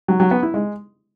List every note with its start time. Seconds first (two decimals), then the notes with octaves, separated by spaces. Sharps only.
0.08 F#3
0.20 F#3
0.31 B3
0.43 E4
0.54 G#3